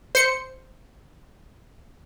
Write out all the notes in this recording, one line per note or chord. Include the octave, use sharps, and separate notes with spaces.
C5 C#7